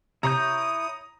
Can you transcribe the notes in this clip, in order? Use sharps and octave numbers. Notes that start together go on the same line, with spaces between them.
C3 E4 C#5 A#5 D#6 G6